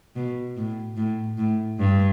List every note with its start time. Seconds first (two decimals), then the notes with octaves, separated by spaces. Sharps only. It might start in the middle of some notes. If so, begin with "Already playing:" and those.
0.16 B2
0.57 A2
0.97 A2
1.38 A2
1.79 G2